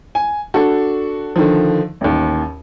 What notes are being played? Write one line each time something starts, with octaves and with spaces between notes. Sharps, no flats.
G#5
D4 F#4 A4
D3 D#3 F3
A1 D#2